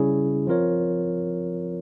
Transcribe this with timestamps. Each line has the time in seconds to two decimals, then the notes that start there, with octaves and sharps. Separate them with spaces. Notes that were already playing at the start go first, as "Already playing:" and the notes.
Already playing: C#3 G3 C#4 E4 G#4
0.47 F3 C4 F4 A#4 C#5